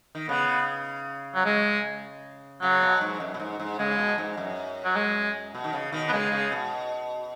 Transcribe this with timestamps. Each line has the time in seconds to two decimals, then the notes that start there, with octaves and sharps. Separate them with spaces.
0.15 D#3
0.29 C#3 B3
1.35 F#3
1.45 G#3
2.62 C#3 F#3
2.82 B2
3.01 G#2
3.20 F#2
3.34 B2
3.40 G#2
3.60 G#2
3.79 C#3 G#3
3.98 B2
4.18 G#2
4.37 F#2
4.84 F#3
4.96 G#3
5.55 B2
5.64 D#3
5.73 C#3
5.92 B2 D#3
6.09 B3
6.13 C#3 G#3
6.32 C#3
6.52 B2